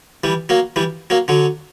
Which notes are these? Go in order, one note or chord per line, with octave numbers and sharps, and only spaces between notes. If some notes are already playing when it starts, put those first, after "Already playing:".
E3 G3
F#3 A#3
E3 G3
F#3 A#3
D3 F#3